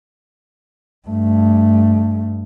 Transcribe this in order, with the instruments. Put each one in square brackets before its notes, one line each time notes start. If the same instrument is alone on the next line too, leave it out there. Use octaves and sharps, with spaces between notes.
[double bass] G2 A3